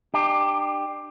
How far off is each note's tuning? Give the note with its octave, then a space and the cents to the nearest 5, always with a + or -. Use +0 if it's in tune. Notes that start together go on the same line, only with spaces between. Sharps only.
D4 +35 G4 +10